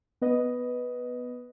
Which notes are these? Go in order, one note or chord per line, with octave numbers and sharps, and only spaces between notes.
B3 B4 D#5